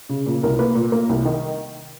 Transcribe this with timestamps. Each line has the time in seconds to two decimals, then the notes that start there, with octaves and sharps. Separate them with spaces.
0.09 C#3
0.26 A#2
0.43 C2 A#4
0.59 A#3 B4
0.75 A#2
0.92 A#3
1.09 C2
1.25 D#3